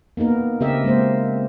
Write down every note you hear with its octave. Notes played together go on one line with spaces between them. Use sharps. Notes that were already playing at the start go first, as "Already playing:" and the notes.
A#3 B3 D#4 A#4
C#3 C4 G4 A#4 D#5 E5
G#3 A#3 C5